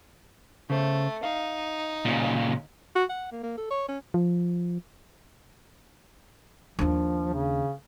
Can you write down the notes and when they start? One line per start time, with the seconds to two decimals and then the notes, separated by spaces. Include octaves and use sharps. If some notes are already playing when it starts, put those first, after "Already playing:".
0.70 C#3 A3 C5
1.23 D#4 F5
2.05 A#2 C#3
2.95 F#4
3.09 F#5
3.31 A#3
3.43 A#3
3.57 A4
3.70 C#5
3.88 C#4
4.14 F3
6.79 D#2 F3 D4
7.34 C#3